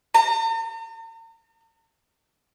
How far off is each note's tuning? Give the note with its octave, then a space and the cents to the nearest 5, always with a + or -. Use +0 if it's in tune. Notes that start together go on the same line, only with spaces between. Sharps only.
A#5 -45